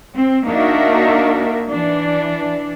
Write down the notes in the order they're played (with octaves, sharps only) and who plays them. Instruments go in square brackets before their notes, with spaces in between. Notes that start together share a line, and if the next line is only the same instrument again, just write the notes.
[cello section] C4
A#3 D4 D#4 F#4 A#4 E5
E3 D4